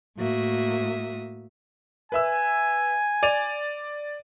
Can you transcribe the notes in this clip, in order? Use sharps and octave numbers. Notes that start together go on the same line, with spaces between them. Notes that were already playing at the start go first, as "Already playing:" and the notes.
A2 A#3 F#4 E5 D#6
B4 E5 G#5 E6
D5 D#7 F7